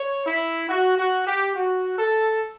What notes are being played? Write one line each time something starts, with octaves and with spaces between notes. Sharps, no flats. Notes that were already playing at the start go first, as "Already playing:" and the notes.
Already playing: C#5
E4
F#4
F#4
G4
F#4
A4